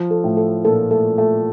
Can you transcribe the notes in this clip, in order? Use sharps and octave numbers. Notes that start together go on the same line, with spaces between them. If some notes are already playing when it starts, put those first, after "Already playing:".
Already playing: F3
A4
A2
A4
A#2 A4
A3 A4
A3 A4